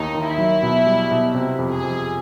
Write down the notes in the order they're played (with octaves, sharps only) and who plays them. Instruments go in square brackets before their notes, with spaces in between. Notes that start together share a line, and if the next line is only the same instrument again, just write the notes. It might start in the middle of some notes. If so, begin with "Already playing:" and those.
Already playing: [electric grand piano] D#2 [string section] D#4
[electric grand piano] D#3
[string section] E4
[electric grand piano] F#3
B2
G3
B2
C3
F2
[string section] G#4
[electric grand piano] F2